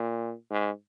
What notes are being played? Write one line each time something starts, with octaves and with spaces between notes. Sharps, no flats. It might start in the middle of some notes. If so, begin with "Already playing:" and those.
Already playing: A#2
G#2